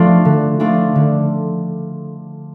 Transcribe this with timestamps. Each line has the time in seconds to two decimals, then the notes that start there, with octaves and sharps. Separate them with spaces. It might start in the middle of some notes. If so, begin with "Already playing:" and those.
Already playing: F3 A3 D4 F4
0.25 D3
0.60 F3 A3 D4 F4
0.95 D3